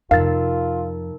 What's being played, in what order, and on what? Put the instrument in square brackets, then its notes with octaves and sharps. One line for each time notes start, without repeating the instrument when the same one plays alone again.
[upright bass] F2 C3 [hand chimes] D#4 A#4 [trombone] F4 [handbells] F5 A6